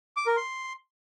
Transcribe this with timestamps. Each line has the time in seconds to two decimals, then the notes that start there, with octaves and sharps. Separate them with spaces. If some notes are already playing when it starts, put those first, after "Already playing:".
0.17 D6
0.27 A#4
0.37 C6